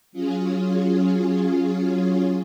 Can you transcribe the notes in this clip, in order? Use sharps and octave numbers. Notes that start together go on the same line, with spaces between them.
F#3 C#4 F4 G#4